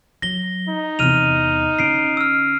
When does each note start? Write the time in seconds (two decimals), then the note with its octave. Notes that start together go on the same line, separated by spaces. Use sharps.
0.22 F#3 A#6 G7
0.69 D#4
0.99 E2 C3 F6 D#7 F7
1.79 D3 C#4 C7 D7
2.17 E6 F6